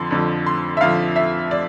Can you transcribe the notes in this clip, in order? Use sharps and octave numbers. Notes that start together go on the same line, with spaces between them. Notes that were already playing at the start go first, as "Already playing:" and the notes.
Already playing: F2 D3 F3 C6
F2 D3 F3
C6
E5
F2 D3 F3 F5
E5
D5